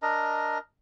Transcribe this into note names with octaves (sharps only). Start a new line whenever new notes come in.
D4 A#4 D#5 A#5